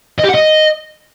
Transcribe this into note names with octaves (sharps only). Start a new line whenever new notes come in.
D#5
G4
F#5
D#5